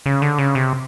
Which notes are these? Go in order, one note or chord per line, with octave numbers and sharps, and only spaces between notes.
C#3
D3
C#3
C3